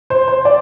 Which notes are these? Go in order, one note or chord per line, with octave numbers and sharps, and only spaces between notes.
C5
C5
D5